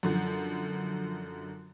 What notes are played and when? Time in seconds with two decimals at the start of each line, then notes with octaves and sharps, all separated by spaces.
0.03 F#2 D3 F3